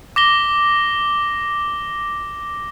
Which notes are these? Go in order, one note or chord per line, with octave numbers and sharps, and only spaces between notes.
D6 A#6 G7